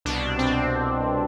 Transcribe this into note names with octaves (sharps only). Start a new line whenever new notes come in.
C2 B2 D4
C4